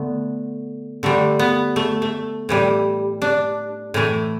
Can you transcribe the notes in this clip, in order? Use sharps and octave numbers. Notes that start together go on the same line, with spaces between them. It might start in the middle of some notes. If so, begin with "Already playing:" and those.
Already playing: D3 A3 B3
D3 G3 A3
B3
A3
A3
A2 E3 G3
D4
A2 E3 A3